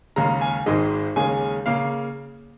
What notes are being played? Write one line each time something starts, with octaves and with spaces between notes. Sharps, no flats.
D#2 C#3 G#3 A#5
G#5
G#1 G#2 D#3 G#3 D#5
D#2 C#3 G#3 C#4 G#5
C#3 A#3 F5